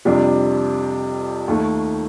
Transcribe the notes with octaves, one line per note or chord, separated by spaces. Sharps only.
F2 C3 G3 D4
D#2 D#3 A3